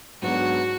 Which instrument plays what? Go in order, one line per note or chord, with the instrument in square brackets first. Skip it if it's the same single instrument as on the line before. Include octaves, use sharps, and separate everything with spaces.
[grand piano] G#2 F#3 B3 D4 [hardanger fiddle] F#4